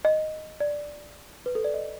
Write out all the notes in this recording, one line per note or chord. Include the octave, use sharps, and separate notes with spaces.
D#5
D5
B4
A4
D5
D#5